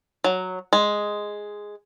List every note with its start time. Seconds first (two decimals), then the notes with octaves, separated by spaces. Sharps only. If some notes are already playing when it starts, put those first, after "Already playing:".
0.24 F#3
0.73 G#3